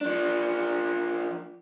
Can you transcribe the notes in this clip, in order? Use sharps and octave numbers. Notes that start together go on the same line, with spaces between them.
F3 D4